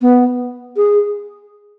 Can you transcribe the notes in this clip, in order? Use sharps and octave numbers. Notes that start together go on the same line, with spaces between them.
B3
G#4